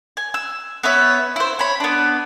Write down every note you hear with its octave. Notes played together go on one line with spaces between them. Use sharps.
G#5
E6
B3 B4 C#5 E5
E4 C5
C#5 B5
B3 D4